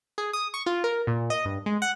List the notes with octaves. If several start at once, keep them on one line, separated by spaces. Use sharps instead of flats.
G#4
D#6
C#6
F4
A#4
A#2
D#5
G2
G#3
F#5